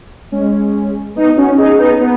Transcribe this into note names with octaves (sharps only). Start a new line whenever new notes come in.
G#3 C#4
B3 D#4
C#4 F#4
D#4 G#4
B3 D#4
B3